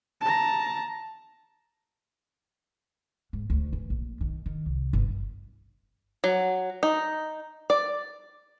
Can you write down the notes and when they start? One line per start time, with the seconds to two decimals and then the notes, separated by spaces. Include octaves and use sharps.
0.21 A5 A#5
3.33 G#2
3.50 D2
3.73 E3
3.90 A#1
4.21 D#3
4.46 D#3
4.66 C2
4.93 G1
6.24 F#3
6.83 D#4
7.70 D5